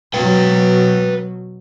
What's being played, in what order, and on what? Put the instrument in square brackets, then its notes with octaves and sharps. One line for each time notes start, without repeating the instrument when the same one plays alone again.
[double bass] B2 F#3 [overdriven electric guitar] B4 G5